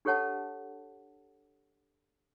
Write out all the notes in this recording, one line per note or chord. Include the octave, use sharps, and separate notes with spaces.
D4 G4 A4 C#5 F#5 A5